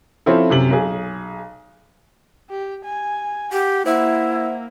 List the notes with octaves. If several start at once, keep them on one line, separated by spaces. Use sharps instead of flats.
F3 C4 C#4 E4 A4
F#2 C3 F#7
B1 G#4
G4
G#5
G4 F#5
A#3 E4 C5 E5 F#5